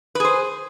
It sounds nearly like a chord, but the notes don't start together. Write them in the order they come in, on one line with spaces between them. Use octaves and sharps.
B4 G#4 C5